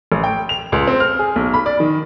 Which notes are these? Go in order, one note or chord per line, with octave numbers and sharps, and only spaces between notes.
A1
G5
F7
C#2
C4
F6
G#4
B1
B5
D5
D#3